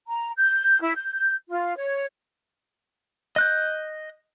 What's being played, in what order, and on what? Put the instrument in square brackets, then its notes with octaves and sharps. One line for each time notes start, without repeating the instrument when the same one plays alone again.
[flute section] A#5
G6
E4
G6
F4
C#5
[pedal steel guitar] D#5 F#6 G6